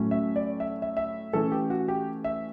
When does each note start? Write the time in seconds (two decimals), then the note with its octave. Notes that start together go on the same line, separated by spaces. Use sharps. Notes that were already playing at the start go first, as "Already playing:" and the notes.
Already playing: A2 F#3 A3 C#4
0.11 E5
0.36 D5
0.60 E5
0.82 E5
0.97 E5
1.33 E3 A3 C#4 A4
1.52 G4
1.70 F#4
1.88 G4
2.24 E5